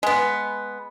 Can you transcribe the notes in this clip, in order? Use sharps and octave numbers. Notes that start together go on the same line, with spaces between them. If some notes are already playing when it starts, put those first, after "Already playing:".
G#3 B3